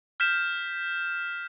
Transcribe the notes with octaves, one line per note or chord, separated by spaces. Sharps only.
F6 G6 B6 E7